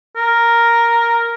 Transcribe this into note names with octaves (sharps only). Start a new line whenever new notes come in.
A#4